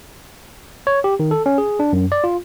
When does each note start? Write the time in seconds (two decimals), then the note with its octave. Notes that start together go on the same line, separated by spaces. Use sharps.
0.87 C#5
1.04 G4
1.20 D#3
1.31 A4
1.46 C#4
1.58 G#4
1.80 D4
1.93 F#2
2.12 D5
2.24 F4